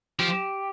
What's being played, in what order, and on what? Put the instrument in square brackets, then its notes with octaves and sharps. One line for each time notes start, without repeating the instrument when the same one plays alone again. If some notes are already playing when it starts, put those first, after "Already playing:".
[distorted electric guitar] F3 [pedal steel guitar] G4